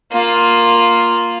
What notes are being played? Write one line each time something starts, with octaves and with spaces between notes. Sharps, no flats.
A#3 F4